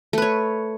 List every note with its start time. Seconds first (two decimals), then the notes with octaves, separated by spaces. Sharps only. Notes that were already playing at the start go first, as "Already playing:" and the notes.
0.13 A3
0.18 B4
0.22 C#5